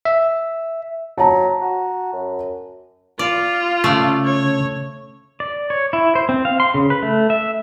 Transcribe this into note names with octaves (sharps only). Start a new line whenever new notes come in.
E5
F#3 A5 A#5
F#4
F#2
F4 D5
C#3 A3 D5
C#5
D5
C#5
E4
C5
C4
F5
C6
C#3
B4
A3
E5